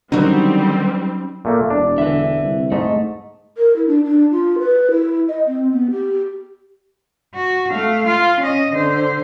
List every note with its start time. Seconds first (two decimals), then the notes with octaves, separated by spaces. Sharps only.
0.12 D3 D#3 F#3 G3 C4 C#4 D#4 F#4
1.45 A#2 A3 A#3
1.70 E1 D4 D5
1.98 D3 B4 E5
2.42 C2
2.72 G#2 A3 D#5
3.57 A#4
3.76 E4
3.87 D4
4.04 D4
4.31 F4
4.59 B4
4.91 E4
5.28 D#5
5.47 C4
5.72 B3
5.91 G4
7.35 F#4
7.71 A3 F5
8.07 F4
8.40 C#4 D#5
8.74 D3 C5